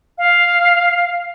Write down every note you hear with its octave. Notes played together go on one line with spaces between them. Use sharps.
F5